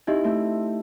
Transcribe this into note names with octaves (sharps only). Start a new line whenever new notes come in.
C4 D#4 E4 G4 D#5
A3 C4